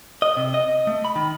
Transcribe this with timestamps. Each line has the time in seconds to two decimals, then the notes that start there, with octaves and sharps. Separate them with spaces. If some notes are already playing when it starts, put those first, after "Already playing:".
0.22 D#5
0.37 C3
0.54 D#5
0.87 A3
1.05 B5
1.16 D#3